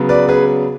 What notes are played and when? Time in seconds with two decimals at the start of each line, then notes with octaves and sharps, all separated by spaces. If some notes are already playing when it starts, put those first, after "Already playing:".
Already playing: C#3 F#3 B3
0.09 B4 D5
0.29 G#4 B4